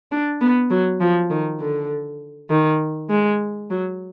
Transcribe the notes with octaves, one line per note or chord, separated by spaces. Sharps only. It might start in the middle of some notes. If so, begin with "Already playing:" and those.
D4
B3
F#3
F3
D#3
D3
D#3
G#3
F#3